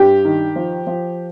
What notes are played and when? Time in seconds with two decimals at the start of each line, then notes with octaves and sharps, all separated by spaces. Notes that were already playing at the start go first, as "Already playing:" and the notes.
Already playing: G2 G4
0.25 D#3
0.56 F3
0.87 F3